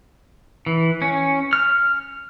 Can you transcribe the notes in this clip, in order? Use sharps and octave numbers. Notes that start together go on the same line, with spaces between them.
E3
C#4
F6